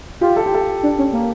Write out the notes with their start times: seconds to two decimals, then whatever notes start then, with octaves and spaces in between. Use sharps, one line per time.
0.21 F4 G4
0.37 A4
0.46 G4
0.55 A4
0.83 D4
0.98 C#4
1.13 A#3